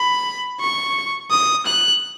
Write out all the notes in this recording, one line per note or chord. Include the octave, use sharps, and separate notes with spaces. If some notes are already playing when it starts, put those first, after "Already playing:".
Already playing: B5
C#6
D#6
F#6